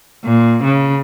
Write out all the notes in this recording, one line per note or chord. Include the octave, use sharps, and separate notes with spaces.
A#2
C#3